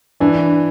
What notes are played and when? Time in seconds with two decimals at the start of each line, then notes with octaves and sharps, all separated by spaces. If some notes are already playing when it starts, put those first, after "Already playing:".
0.20 E3 D4